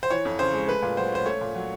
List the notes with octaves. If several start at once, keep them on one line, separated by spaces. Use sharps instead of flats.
C5
E3 C#5
F2
C#3 C5
G#3
A3 B4
A#2
F#3 C5
C#4 C5
A3 C#5
A#2
F#3